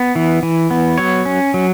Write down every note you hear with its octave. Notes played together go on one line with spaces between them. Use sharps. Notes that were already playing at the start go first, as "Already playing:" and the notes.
Already playing: B3
E3
E3
B3
F#3 C#5
C#4
F#3